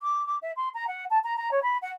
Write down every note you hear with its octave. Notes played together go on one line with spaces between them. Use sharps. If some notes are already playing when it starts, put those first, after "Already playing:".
D6
D6
E5
C6
A#5
F#5
A5
A#5
A#5
C#5
B5
F#5